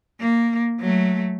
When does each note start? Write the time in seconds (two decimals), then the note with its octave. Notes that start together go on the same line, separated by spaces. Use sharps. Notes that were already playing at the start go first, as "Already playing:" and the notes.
0.20 A#3
0.80 F#3 A3